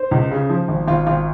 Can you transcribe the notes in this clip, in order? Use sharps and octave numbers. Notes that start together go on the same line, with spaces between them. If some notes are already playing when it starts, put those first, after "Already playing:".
Already playing: C5
C#2
C#3
F3
G#1
G#1 F4
G#1 F4